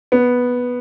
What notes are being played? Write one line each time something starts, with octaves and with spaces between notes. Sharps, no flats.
B3